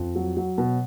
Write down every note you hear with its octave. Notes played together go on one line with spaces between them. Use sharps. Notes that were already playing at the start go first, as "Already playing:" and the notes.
Already playing: F2
F#3
F#3
B2